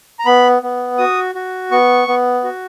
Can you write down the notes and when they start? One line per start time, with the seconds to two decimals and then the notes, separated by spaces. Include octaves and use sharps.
0.19 A#5
0.26 B3 B5
0.63 B3
0.98 F#4 D#6
1.35 F#4
1.71 B3 C#6
2.08 B3
2.44 F#4